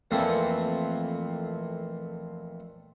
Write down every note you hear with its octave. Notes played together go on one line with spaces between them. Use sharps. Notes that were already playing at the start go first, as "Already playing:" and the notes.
F2 A#2 E3 A3 C4